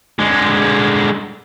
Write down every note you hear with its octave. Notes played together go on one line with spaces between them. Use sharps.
D3 G#3